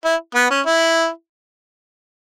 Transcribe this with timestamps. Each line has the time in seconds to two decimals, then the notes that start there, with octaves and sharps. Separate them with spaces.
0.04 E4
0.35 B3
0.50 C#4
0.66 E4